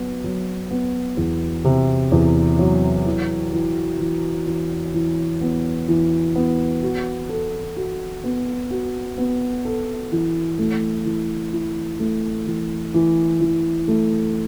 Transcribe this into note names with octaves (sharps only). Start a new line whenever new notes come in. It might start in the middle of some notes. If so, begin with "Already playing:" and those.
Already playing: F#3 B3
F#3
B3
E2
C3
E2
F#3
E3
E3
E3
E3
E3
B3
E3
B3
F#4
A4
F#4
B3
F#4
B3
A4
E3
A3
E3
E4
A3
E3
E3
E3
A3